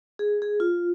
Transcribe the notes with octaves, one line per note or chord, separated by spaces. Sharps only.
G#4
G#4
F4